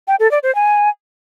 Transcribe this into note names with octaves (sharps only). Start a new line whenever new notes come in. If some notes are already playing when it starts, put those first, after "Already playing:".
G5
A4
D5
C5
G#5